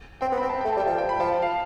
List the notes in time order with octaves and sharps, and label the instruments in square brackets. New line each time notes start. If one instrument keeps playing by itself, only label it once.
[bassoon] C4 [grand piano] G5
[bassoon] B3
[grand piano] B5
[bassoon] C4
[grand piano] A5
[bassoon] A3 [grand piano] G5
[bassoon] G3 [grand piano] A5
[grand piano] G5
[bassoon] F3 [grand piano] A5
[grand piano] G5
B5
[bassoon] F3 [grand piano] A5
[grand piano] F5